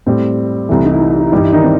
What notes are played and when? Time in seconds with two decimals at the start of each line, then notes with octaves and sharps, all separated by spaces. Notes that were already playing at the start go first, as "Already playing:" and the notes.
0.06 A2 G3 C4
0.69 C2 C3 E3 A3 E4
0.85 D#4
0.93 E4
1.01 D#4
1.10 E4
1.19 D#4
1.27 E4
1.32 G2 E3 G3 D#4
1.44 E4
1.52 D#3 D#4
1.64 C4